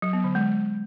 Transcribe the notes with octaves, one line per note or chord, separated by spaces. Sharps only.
F#3
B3
D3
G#3